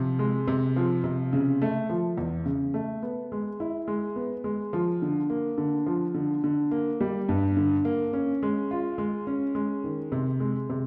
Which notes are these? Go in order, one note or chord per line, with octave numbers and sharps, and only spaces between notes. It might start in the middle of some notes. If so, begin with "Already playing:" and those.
Already playing: C3 F3
G#3
C3
F3
C3
C#3
A3
F3
E2
C#3
A3
B3
G#3
E4
G#3
B3
G#3
F3
D3
A#3
D3
F3
D3
D3
A#3
G3
G2
D3
A#3
C#4
G#3
F4
G#3
C#4
G#3
D#3
C3
G#3
C3